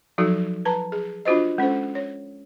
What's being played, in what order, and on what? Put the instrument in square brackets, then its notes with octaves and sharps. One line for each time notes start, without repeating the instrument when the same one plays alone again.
[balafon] F3 F#3 D#4 F#4 A4
B4 A5 A#5
G#4
D4 F4 F#4 C5 D#5
G#3 C#4 A4 C5
C#5